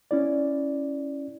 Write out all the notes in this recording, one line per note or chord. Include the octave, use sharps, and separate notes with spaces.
C#4 E4 D5